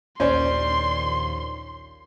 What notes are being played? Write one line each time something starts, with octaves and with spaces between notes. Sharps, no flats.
A#1 D#2 A#2 C#4 C5 D5 C6